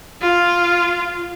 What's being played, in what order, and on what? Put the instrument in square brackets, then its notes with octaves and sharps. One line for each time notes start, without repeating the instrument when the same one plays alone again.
[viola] F4